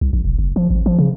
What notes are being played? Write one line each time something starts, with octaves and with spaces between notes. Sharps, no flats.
C2
A#1
E1
F#1
F3
A1
F3
C#3